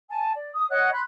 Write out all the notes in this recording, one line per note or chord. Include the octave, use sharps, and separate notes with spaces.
G#5 A5
D5
D#6
C#5 D#5 F#5 F#6
B5 C6 F#6